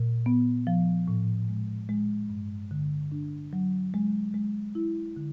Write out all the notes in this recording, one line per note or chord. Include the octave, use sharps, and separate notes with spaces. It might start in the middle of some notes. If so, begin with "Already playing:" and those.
Already playing: A#2
B3
F3
A2
G#3
G#3
G2
D3
D4
F#3
G#3
G#3
E4
D3